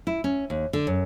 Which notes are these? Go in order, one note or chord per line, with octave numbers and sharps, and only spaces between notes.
E4
C#4
D#2
D3
F#2